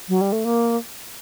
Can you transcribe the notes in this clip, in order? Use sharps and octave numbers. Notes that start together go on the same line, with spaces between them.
F#3
G3
A3
A#3